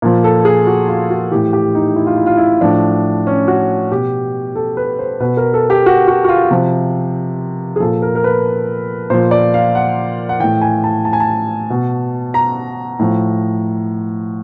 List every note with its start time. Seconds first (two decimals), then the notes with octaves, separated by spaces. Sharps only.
0.02 A#2 F3
0.24 A4
0.45 G#4
0.67 F#4
0.88 F4
1.10 F#4
1.31 A2 E3 G4
1.53 G4
1.75 D#4
1.96 E4
2.07 F4
2.17 E4
2.26 F4
2.37 E4
2.61 A2 F3 D4
3.27 C#4
3.48 F#4
3.91 B2 G4
4.55 A4
4.77 B4
4.99 C5
5.20 B2 B4
5.37 A#4
5.54 A4
5.70 G4
5.86 F#4
6.08 F#4
6.25 F#4
6.29 F4
6.51 C3 F3
7.76 G#4
7.80 A#2 F3 A4
8.02 A#4
8.15 A#4
8.24 B4
9.10 A#2 F3 C5
9.31 D5
9.54 F5
9.75 F#5
10.29 F#5
10.39 A2 E3 G5
10.61 G#5
10.84 A5
11.05 A5
11.13 G#5
11.20 A5
11.70 B2
12.34 A#5
12.99 A2 F3